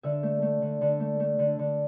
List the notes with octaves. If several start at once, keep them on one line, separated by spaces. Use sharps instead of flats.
D3 E5
A3
A3
D3
D3
A3
A3
D3
D3